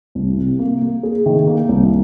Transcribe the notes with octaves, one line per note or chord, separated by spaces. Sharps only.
C2
C3
A#3
A#3
G#4
D#3
A#3
C2